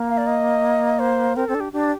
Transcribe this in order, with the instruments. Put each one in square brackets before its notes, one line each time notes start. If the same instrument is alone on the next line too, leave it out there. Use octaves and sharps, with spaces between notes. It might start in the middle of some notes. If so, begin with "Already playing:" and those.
Already playing: [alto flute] A#3
[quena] F5
D5
D#5
C5
[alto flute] C4 [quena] A#4
[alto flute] C4 [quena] A4
[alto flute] D4
[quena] G4
[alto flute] D4 [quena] G4